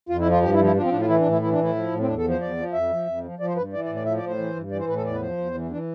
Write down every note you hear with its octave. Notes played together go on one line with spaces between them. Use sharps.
F2 F4
E4
F3
F4
G2 G4
E4
F3
E4
F3 D4
C4
A2 D4
F4
E3 E4
D4
A2
E4
E3 E4
D4
A2
E4
F3
A2
C4
E2 D4
A4
F3
C5
E2 D5
F3
F2 E5
F3
F2
F3
F3 D5
C5
G2 B4
E3 D5
D5
A2
D5
F3 E5
D5
A2 C5
E3
G2
E3 D5
C5
A2 B4
A4
E2 D5
B4
F3 C5
E2
E3
E3 D4